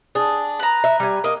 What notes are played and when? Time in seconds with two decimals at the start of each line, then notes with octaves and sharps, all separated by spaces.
0.15 D4 G#4
0.59 B4 A#5
0.84 E5
1.00 G3 G#5
1.24 A#3 D#5